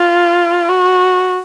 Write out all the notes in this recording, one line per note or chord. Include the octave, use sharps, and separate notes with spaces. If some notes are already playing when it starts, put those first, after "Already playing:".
Already playing: F4
F#4